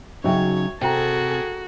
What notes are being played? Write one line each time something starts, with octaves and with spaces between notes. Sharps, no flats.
C#3 F#3 D#4 F#4 C#5 E5 G5
C3 F#4 G#4 A4 G5 A#5